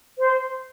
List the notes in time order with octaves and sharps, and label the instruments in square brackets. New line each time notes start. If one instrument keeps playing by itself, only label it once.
[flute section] C5